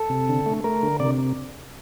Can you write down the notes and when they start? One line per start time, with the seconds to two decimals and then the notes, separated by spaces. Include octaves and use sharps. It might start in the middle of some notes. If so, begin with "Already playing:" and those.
Already playing: A4
0.10 C3
0.29 D3
0.46 A3
0.64 A3 A#4
0.83 D3
1.00 C3 D5